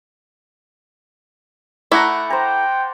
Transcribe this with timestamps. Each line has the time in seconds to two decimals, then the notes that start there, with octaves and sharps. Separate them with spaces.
1.92 A3 E4 D5 F#5 A#5
2.30 C5 G5 A#5